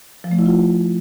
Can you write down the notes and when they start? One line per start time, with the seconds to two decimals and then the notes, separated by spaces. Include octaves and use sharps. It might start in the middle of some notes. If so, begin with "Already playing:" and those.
0.24 F3
0.31 A3
0.39 E4
0.46 F4